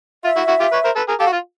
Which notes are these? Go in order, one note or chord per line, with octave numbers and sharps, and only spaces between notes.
F4 E5
E4 F#4
E4 F#4
F4 G4
B4 C#5
A#4 C5
A4 B4
G#4 A#4
G4 A4 F5
F#4
F4